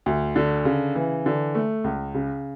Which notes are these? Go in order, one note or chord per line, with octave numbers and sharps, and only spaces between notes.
D2
D3
C#3
E3
D3
A3
C#2
C#3